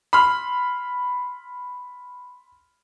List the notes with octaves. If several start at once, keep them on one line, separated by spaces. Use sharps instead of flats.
B5 C6 F6